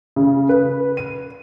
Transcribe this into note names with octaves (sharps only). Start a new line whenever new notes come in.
C#3
B4
D#7